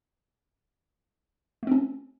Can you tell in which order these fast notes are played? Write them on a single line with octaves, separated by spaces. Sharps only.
A3 C4 C#4